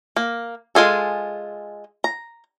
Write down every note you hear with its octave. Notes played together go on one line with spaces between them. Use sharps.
A#3
G#3 F4 G#4 A4
A#5